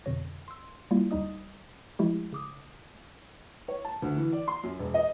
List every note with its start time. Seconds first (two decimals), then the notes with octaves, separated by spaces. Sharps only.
0.05 F2 B2 D3 C#5 A#6
0.48 C6 E6
0.91 G3 A#3 E4 F4
1.11 D2 G3 D#4 D#5 D#6
1.99 F3 G#3 A3 E4 G4
2.33 C#3 D6 D#6
3.68 C#5
3.85 A5
4.02 D2
4.16 E3
4.32 D5
4.48 C6
4.64 F#2
4.79 E1
4.94 D#5